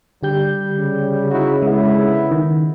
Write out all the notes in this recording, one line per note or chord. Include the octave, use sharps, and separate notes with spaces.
D3 G3 G4 G6
C#3
D#4 E4 F#4
D3 G#3 B3 E4
D#3